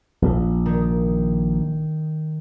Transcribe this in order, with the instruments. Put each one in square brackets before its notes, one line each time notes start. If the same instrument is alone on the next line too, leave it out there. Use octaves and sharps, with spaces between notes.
[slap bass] A#1
[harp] D#3